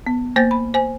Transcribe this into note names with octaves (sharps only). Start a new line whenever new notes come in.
B3
A#3 C5 G5 G6 A6
B5
C5 G#5